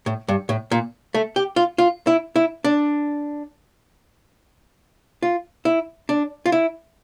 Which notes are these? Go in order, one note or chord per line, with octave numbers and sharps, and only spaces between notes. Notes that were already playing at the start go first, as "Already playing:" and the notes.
A2
G2
A2
A#2
A3
G4
F4
F4
E4
E4
D4
F4
E4
D4
F4
E4